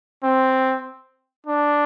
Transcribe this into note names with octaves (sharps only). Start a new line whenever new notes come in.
C4
D4